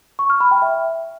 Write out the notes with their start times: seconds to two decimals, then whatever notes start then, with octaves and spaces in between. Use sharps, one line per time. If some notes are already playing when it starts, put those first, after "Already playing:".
0.19 C#6
0.30 F6
0.40 B5
0.51 G5
0.62 E5